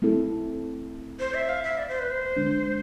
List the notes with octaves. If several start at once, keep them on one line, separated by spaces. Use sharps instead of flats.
A3 C4 E4 A4
C5
E5
F5
E5
D5
C5
B4
C5
D3 G#3 D4